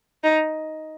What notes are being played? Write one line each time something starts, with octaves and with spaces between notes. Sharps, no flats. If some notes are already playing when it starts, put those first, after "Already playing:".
D#4